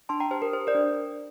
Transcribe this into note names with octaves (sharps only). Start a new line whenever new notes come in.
D4 A5 C6
G5 A#5
G4 C5
A#4
G4 C5
A#4 D5
D4